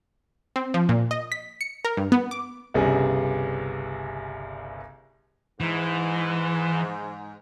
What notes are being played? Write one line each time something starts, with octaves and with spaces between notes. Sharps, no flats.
C4
F3
A#2
D#5
B6
C#7
A#4
G2
B3
D6
G1 C2 C#3 G3 G#4
G#2 E3